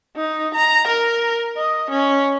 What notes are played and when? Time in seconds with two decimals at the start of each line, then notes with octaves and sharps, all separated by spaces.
0.16 D#4
0.55 A#5
0.87 A#4
1.57 D#5
1.90 C#4